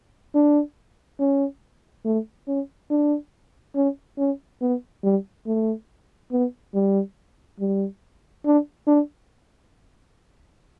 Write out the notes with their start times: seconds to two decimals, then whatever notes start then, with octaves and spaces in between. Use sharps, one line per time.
0.35 D4
1.19 C#4
2.05 A3
2.48 C#4
2.90 D4
3.75 C#4
4.18 C#4
4.62 B3
5.03 G3
5.47 A3
6.32 B3
6.74 G3
7.60 G3
8.45 D4
8.87 D4